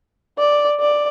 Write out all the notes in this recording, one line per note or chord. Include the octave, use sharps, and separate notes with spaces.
D5
D5